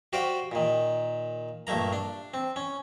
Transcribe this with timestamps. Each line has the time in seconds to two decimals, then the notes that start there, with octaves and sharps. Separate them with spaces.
0.13 F#4 G4 C5 D5 F5 G5
0.52 A#2 D#3
1.67 A#1 G2 A3 A#3 A#5
1.93 D4
2.34 C4
2.56 C#4